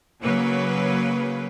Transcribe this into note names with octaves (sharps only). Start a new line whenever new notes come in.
C#3 F#3 A#3 B4